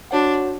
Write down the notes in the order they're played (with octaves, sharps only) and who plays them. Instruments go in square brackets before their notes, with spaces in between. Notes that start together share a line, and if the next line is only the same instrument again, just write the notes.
[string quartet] D4 [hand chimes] F#4 C#5 F#5